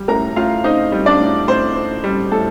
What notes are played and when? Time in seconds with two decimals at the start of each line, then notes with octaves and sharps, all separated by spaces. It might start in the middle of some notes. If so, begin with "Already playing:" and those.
Already playing: G3
0.08 A2 A#4 A#5
0.36 A2 F4 F5
0.64 C4 D#4 D#5
0.92 G3
1.06 D4 D5
1.20 A2
1.48 A2 C4 C5
1.76 C4
2.04 G3
2.32 A2 A4